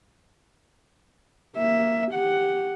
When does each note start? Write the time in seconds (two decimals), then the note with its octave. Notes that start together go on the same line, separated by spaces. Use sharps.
1.57 A#3 E5
2.12 G4 F#5